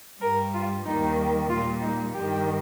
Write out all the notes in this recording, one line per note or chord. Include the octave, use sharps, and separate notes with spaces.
G2 G3 A#4
F4
D#2 D#3 G3 D#4
A#2 G3 F4
D#4
G2 D#3 G3 G4